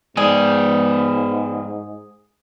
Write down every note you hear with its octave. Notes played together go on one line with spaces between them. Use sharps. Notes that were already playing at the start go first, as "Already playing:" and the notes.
G#2 G#3 B3 G#4 D5